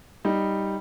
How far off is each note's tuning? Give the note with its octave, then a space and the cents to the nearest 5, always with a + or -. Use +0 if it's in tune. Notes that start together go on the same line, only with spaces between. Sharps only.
G3 +0 D#4 +0